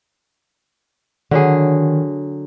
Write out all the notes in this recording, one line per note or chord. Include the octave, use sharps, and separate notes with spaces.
D3 D#3 F#3 G#4